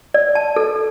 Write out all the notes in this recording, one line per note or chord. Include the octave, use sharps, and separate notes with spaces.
D5
A5
A4